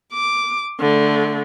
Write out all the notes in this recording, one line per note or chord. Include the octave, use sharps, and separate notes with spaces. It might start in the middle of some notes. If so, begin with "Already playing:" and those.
D6
D3 A3